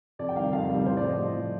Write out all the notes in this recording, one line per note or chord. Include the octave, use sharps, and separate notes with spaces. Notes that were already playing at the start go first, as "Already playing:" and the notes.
F2 D5
G5
D#3 G3 F5
F2 F5
D#3 G3
A2 C5
D5
F3
D#5
A2
F3